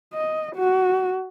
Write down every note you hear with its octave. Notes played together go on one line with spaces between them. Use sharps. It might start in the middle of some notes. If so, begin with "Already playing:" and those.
D#5
F#4